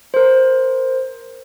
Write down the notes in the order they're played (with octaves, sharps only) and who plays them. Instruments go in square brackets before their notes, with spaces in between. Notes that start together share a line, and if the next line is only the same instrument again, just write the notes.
[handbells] A#4 C5